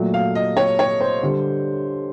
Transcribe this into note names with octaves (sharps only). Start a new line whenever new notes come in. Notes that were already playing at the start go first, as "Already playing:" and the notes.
Already playing: A#2 F#3 A3
F5
D#5
C#5
C#5
C5
D3 G3